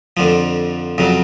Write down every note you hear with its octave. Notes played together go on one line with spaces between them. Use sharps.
F2 D3 F3
F2 C#3 F#3